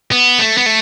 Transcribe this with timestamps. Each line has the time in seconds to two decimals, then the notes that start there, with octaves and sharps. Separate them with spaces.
0.12 B3
0.39 A3
0.58 B3
0.66 A3